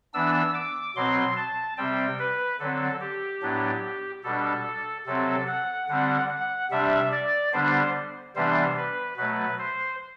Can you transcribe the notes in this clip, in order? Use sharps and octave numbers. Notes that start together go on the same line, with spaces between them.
E3 B3 D4 E6
D6
B2 F#3 C4 C6
A5
C3 G3 C4 G5
B4
D3 F#3 C4 A4
G4
A2 F#3 B3 D4
B2 G3 D4 A4
C3 F#3 C4 A4
F#5
D3 G3 C4 F#5
F#5
C3 G3 D4 E5
D5
D3 G3 B3 D4 C5
C3 E3 G3 B3 D4 C5
B4
B2 F#3 A3 B4
C5